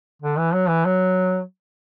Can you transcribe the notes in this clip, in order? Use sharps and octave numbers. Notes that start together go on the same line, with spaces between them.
D3
E3
F#3
E3
F#3